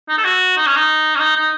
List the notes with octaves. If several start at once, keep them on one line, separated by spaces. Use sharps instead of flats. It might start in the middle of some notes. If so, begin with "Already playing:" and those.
D#4
A4
F#4
D#4
C#4
D#4
C#4
D#4
D#4